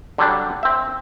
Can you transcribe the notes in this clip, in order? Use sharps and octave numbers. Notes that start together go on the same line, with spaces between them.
D3 F#3 G3 D4
C4 E5